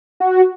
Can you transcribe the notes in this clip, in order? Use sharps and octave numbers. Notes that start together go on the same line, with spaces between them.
F#4